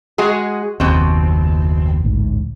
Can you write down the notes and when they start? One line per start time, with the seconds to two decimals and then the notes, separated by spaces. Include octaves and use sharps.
0.18 G#3 F#4 G#4
0.80 F#1 D#2 B2 C4
2.04 A1 D2 G#2